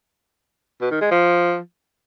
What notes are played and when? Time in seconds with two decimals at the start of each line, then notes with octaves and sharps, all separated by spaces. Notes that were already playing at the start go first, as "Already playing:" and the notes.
0.81 B2
0.91 D#3
1.01 G#3
1.11 F3